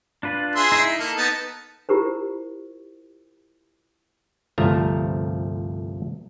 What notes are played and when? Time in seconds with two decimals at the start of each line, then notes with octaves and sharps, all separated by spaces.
0.23 D4 F4 B4
0.55 G#4 E5 C6
0.72 D#4 E4
0.99 A#3 A4
1.17 B3 D#4 A5
1.89 E4 F4 G4 A#4 C5
4.58 G1 C2 F3 A3 A#5